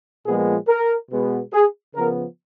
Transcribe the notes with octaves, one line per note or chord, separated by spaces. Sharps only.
A#2 F3 G#3 B3 G#4
A#4
B2 G#3 B3
G#4
C#3 F3 B3 A#4